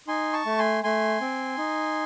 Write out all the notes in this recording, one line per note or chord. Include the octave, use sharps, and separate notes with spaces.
D#4 G#5 C6
A5 C#6
A3
G#5 C6
A3 G#5 C6
C4
D#4